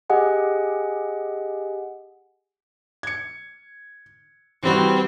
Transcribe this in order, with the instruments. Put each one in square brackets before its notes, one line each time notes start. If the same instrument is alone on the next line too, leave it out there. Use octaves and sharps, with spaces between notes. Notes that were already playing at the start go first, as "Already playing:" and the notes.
[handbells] G4 G#4 D#5 F#5 G#5
[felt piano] G#6 C#7
[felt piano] E3 G3 F#4 [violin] C4